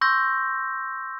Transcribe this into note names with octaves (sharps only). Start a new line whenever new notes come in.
C6 C#6 E6 G6 A#6